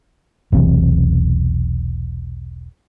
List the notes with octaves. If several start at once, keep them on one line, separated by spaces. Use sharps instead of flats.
E1 B1 C3 E3